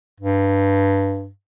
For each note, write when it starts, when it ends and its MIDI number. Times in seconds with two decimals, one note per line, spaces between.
0.21 1.29 43